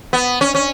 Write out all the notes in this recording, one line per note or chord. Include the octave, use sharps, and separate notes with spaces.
B3
C#4
C#4